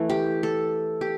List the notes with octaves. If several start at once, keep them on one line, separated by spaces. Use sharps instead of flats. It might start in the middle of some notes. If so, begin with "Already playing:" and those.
Already playing: E3 A3
G4
A4
G4